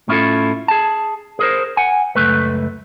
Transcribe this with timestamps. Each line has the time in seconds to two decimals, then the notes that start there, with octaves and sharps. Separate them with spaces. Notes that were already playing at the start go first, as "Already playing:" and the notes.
0.08 A2 C#4 E4 F4 A4
0.68 G#4 A5
1.39 G#4 A#4 C5
1.77 F#5 G#5
2.16 C#2 F#2 A3 B4